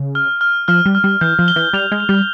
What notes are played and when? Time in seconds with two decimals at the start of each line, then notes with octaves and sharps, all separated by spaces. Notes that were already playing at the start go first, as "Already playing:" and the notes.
Already playing: C#3
0.15 F6
0.41 F6
0.68 F3 F6
0.86 G3
0.95 F6
1.04 G3
1.21 E3 G6
1.39 F3
1.48 G7
1.56 E3
1.73 G3 F7
1.92 G#3
2.00 F7
2.09 G3